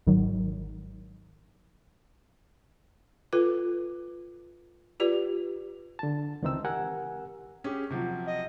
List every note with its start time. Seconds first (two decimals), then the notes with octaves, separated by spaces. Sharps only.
0.07 G#1 D#3 F#3
3.33 F4 A4 B4
5.00 F4 G4 B4 D5
5.99 D3 A5
6.42 C#2 D#3 E3 C4 D#4 E6
6.65 G4 A#4 F#5 G#5
7.64 C#4 G4 G#4
7.90 C3 F3 F#3
8.27 D#5